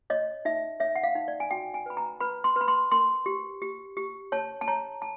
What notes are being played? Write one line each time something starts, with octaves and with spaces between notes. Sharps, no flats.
C#5 D#5
D#4 E5
C#5 E5
F#5
F5
D#4
D5
G#5
F#4 G5
G#5
B4 B5
A#5
B4 B5
C6
B4 B5
C6
A#4 C6
G4
G4
G4
C#5 A5
A5
C#5 A#5
A5